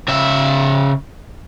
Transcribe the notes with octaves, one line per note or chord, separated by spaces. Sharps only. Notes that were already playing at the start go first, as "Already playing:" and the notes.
C#3 E5